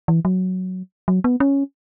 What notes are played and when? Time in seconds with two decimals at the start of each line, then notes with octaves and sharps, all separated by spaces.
0.08 E3
0.25 F#3
1.08 F#3
1.24 B3
1.40 C#4